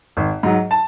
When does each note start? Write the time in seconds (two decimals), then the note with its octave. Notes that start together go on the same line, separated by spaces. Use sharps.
0.17 G#1
0.43 G#2 F#3
0.71 A5